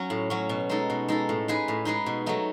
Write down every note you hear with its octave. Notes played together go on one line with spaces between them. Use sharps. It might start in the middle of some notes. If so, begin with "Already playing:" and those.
Already playing: F#3 C#4
A2
F#3 C#4
B2
G#3 D#4 A4
B2
G#3 D#4 A4
A2
G#3 D#4 G#4 B4
A2
G#3 D#4 G#4 B4
B2
F#3 A3 D#4